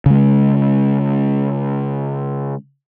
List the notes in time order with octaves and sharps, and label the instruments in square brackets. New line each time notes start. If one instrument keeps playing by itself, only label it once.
[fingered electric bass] C#3 G#3